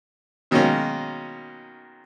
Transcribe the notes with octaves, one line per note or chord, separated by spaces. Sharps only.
B2 D#3 F#3 G#3 A#3 C#4